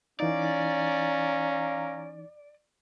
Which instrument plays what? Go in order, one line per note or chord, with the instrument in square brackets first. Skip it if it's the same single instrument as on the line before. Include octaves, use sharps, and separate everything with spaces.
[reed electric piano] E3 D#4 [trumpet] C#4 [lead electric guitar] D5 [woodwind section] F5 A#5